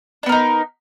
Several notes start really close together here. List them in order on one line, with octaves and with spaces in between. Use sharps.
D4 B3 A#4 D#4